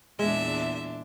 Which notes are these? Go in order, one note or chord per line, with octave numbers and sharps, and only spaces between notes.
E2 A#2 G#3 D4 E5